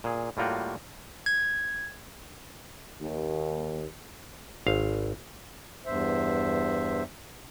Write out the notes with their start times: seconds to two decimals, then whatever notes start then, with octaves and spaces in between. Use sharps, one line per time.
0.04 A#2 G#4
0.37 A2 G3 A#3 F4 F#4 G5
1.26 G#6
3.02 D#2
4.67 G#1 F5
5.86 E2 G2 C5 E5